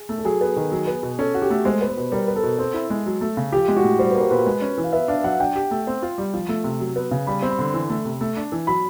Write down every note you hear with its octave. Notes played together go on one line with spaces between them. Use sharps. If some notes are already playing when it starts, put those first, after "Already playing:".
Already playing: G#4
A3
A4
F#3 G#4
B3
D#3
F#3
B3
B2
C#4 A4
F#4
G4
A3
G#3 C5
B3
B4
B2
G3 A#4
B3
A4
B2
C4
E4
G#3
F#3
A3
C#3
F3 G4
G#3
F#4
A2
G3 C5
A#3 B4
A#4
A#2 B4
G#3
C#4
E3
F5
B3 E5
D4 F5
F#3 F#5
D4 G5
G4
A3
C4
F4
G3
F3
A3
C3
F#3
B3
C#3
G3 B5
C4
B5
D3
E3
A3
C3
A3
D4
E3
F#3 B5